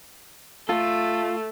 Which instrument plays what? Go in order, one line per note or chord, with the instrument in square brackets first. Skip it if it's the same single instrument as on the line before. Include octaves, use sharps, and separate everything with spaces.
[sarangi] A3 [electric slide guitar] F4 A4